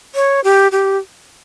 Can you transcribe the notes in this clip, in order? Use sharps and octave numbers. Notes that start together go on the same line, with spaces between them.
C#5
G4
G4